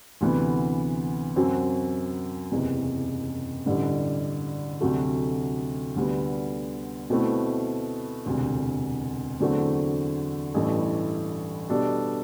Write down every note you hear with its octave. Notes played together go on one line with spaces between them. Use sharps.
D2 C3 E3 B3
F#2 F#3 C4 F#4
F#1 E2 C3
A1 G2 D3 G3
D2 C3 F#3 A3
D2 D3 G3 B3
B2 A3 C4 E4 B4
E1 D2 C3
E2 D3 F#3 A3 C4
A1 G2 E3 A3
B2 G3 D4 A4